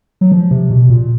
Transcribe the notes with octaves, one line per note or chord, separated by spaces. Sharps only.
F#3
F3
C3
B2
A#2